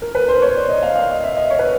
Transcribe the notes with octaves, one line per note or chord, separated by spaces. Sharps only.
A#4
B4
C5
C#5
D5
D#5
F5
F5
D#5
E5
D#5
C#5
B4